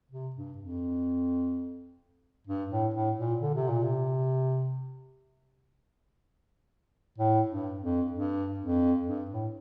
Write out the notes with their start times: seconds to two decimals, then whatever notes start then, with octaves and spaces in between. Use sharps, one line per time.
0.11 C3
0.36 G2
0.58 F2
2.47 G2
2.71 A2
2.94 A2
3.18 A#2
3.41 D3
3.55 C3
3.68 A#2
3.83 C3
7.18 A2
7.49 G2
7.80 F2
8.12 G2
8.60 F2
9.07 G2
9.31 A2